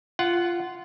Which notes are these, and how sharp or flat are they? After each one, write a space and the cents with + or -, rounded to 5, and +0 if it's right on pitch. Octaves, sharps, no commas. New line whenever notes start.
F4 -15 F#5 +5